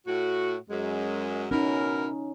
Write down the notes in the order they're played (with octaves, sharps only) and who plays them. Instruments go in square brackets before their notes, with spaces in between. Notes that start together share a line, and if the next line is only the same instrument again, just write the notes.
[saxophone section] A2 F#4
F#2 G#3
[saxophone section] B2 E4 A#4 [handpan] C#4 D#4